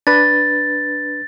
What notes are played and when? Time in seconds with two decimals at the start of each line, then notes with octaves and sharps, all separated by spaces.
0.07 D4 B4 A6